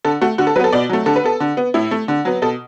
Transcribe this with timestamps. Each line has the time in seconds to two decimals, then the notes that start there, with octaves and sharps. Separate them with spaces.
0.05 D3 A4
0.21 A3 F#4
0.38 D3 F#4
0.47 A4
0.56 F#3 B4
0.59 B3 A4
0.72 B2 D5
0.89 F#3 A3
1.06 D3 A4
1.16 B4
1.24 B3 A4
1.40 D3
1.57 B3
1.74 A2 E4
1.91 A3
2.08 D3
2.25 F#3 B3
2.42 B2 A4